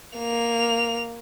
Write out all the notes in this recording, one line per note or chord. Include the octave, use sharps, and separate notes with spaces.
A#3 F7